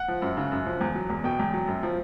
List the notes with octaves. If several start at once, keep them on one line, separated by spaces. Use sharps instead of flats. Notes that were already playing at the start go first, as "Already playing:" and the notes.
Already playing: F#5
F3
F#2
C#3
F#2
F3
E2
F#3
E2
B2 G5
E2
F#3
F#2
F3